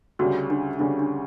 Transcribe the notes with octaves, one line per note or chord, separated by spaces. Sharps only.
D2 C#3 G3 F#4
D4
D2 C#3 G3 D4
D4